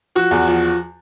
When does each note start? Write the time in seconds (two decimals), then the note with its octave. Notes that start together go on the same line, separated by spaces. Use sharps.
0.15 F3 F#4
0.31 E2
0.48 F3